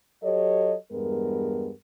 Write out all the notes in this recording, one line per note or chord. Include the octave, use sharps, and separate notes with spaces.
F#3 G4 A4 C#5 D#5
E2 G2 G#3 B3 A#4